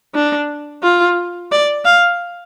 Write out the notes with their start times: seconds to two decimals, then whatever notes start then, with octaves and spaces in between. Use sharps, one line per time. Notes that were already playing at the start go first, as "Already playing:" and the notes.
0.15 D4
0.83 F4
1.51 D5
1.85 F5